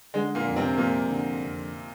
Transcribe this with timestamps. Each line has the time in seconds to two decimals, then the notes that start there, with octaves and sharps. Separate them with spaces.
0.14 D3 G#3
0.35 A#2 A#3
0.46 F2
0.56 C3 C4
0.77 F2 A#2 A#3
1.09 D3
1.41 F2